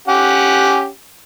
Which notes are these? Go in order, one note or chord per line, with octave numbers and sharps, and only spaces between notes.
C#4 G4 F#5